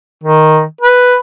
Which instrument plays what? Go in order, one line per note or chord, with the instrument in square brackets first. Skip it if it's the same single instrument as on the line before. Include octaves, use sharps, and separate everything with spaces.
[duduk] D#3
B4